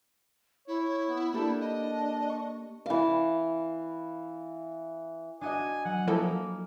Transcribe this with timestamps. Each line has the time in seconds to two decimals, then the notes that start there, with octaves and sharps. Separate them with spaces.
0.68 E4 C#5
1.07 B3
1.33 A#3 D4 G4 A4
1.60 D#5
2.30 C#6
2.86 E3 F5
5.41 D4 F#4 D#5 G#5
5.85 F#3 F#5 G#5
6.07 F3 A#3 E4 A4